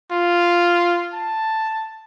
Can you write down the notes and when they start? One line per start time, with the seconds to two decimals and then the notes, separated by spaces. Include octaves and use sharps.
0.11 F4
1.13 A5